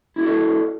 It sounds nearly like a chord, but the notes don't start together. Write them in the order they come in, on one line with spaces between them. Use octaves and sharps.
E4 G#4 F#4 A4 D5